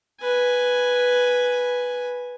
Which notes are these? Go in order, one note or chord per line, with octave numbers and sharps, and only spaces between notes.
B4 G#5